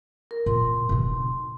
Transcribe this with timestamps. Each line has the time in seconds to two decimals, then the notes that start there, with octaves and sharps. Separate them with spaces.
0.31 A#4
0.46 A#2 C6
0.89 B2 D#4